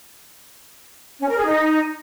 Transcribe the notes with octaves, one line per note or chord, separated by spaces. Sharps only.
C#4
A#4
G#4
D#4